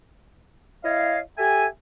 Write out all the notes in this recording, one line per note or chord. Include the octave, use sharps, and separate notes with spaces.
E4 C#5 D#5 F5
G4 A4 E5 G#5